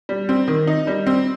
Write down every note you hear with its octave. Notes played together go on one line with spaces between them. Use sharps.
G3
C4
D#3
D#4
G3
C4